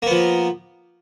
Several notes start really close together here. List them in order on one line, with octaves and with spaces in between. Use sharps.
A#3 B3 F3